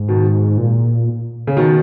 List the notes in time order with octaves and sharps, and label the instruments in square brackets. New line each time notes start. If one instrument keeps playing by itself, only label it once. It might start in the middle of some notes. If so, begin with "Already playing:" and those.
Already playing: [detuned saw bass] G#2
[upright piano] B2 D#3
[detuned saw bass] A#2
[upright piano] C#3
B2 D#3